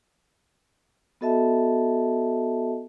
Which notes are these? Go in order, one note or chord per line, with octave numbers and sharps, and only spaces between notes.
B3 F#4 A4 D#5 E5 A5